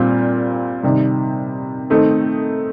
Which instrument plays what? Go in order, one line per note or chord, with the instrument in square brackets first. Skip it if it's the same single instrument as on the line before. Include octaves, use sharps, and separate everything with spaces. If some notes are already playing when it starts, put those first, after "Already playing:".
Already playing: [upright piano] A#2 G3 C4 F4
C3 D#3 G3
D#3 A3 C4 D#4